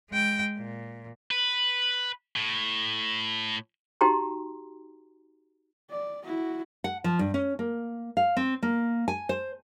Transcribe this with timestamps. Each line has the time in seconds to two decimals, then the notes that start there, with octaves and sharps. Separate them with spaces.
0.10 G#3 G5
0.57 A#2
1.31 B4
2.36 A2
4.01 D#4 F#4 G4 G5 A#5 C6
5.90 D5
6.25 E4 F#4
6.84 F#5
7.04 F3
7.19 G2
7.34 C#4
7.59 A#3
8.17 F5
8.37 C4
8.63 A#3
9.08 G#5
9.29 C5